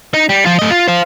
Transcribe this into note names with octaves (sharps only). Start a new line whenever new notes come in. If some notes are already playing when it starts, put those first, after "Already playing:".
D#4
G3
F3 F4
A3 D#5
F4
C5 F5